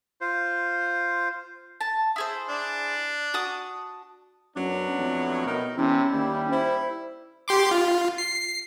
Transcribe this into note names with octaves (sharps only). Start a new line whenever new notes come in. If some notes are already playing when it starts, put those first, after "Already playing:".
F4 C5
A5
E4 G#4 C5
D4
F#4 A5 D#6
F#2 F#3 B3 D4
F2 A2
B2 D#4 A#4
E2 C3 C#4 E4
D#2 G3 C#4
E4 C5
G4 C6 D6
F4
C7